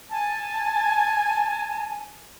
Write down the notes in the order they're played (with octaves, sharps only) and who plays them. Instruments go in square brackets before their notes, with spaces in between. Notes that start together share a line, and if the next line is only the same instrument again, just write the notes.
[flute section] G#5 A5